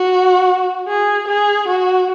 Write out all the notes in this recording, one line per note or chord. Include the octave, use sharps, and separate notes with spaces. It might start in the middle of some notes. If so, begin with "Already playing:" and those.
Already playing: F#4
G#4
G#4
F#4